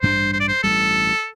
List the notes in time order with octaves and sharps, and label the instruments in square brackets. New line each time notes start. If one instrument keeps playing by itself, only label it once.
[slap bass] A1 G2 G3 D4 [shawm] C5
[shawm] C5
D5
C5
[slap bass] A1 G2 G3 [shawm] A4